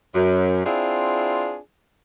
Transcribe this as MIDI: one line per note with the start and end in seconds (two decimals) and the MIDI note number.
0.15 0.65 42
0.66 1.57 60
0.66 1.57 62
0.66 1.57 64
0.66 1.57 65
0.66 1.57 68